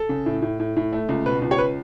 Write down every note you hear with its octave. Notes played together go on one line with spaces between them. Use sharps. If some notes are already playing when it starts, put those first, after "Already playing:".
Already playing: A4
C#3
A2
A2
A2
A2
A3
C#2
B2 B4
C#2
C#5
B4